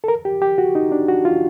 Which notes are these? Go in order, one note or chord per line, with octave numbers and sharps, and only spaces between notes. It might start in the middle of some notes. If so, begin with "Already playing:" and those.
A4
A#4
G4
G4
F#4
D#4
D4
F#4
F4